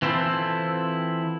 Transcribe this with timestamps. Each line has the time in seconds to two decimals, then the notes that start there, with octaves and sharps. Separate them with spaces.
0.02 E3 C4 E4 F4 A4 C5